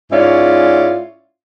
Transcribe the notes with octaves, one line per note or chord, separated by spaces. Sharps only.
G#2 C#4 E4 F4 C#5 D5